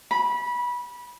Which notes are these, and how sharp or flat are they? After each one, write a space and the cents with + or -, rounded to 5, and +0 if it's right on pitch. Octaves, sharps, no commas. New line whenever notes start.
B5 -20